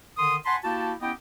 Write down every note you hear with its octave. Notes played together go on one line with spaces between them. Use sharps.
D3 D#3 C6 D#6
F#5 G#5 A5 B5 C6
A#3 E4 F#4 G4 A5
B3 C#4 E4 G4 D#5 G5